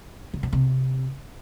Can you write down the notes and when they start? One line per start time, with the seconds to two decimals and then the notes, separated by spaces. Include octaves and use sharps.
0.33 D3
0.43 B2
0.53 C3